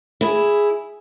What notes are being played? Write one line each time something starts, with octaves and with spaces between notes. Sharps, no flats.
E4 G#4